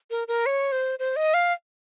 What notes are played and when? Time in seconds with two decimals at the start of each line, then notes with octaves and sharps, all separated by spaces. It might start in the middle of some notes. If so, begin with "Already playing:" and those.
0.11 A#4
0.28 A#4
0.46 C#5
0.72 C5
0.99 C5
1.16 D#5
1.34 F5